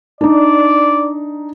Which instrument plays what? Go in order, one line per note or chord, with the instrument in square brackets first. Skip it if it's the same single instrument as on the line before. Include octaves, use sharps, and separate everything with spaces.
[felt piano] D4 D#4 [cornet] D5